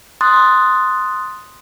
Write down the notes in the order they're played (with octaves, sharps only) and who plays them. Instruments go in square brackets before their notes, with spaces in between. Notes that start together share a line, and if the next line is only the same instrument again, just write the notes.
[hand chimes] C6 D#6 F#6 A6